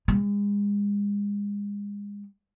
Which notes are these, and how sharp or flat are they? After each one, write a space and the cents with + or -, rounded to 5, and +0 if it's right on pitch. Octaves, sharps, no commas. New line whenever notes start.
G#3 -35